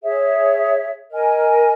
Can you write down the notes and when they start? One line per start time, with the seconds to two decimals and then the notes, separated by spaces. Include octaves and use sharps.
0.03 G#4 C#5 E5
1.10 A#4 D#5 G#5